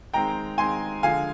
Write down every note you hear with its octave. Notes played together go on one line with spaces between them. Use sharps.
D#3 G#3 C4 G5 A#5
D#3 G#3 C4 G#5 C6
D3 F3 G#3 F5 G#5